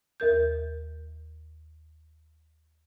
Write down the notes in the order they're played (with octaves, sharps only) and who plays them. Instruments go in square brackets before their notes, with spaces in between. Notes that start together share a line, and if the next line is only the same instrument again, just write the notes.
[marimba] D#2 A#4 G6